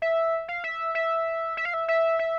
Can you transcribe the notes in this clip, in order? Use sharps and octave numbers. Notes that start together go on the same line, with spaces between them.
E5
F5
E5
E5
E5
F5
E5
E5
E5